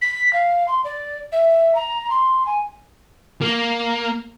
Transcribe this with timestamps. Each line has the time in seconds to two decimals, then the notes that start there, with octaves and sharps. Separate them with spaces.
0.02 B6
0.33 F5
0.68 C6
0.84 D5
1.32 E5
1.75 A#5
2.10 C6
2.46 G#5
3.41 A#3